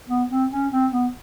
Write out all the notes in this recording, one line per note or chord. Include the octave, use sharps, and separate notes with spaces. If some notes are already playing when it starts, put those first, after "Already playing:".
B3
C4
C#4
C4
B3